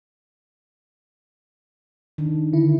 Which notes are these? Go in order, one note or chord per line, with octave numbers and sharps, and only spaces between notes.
D#3 D4
D3 E4